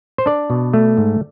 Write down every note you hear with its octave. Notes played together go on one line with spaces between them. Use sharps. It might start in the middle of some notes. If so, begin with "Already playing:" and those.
C5
D4 D5
B2
A3
G#2